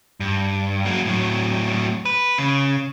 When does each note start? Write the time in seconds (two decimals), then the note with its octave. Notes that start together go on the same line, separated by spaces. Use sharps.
0.20 G2
0.85 F#3 A#3
1.06 A2 F#3
2.05 B4
2.38 C#3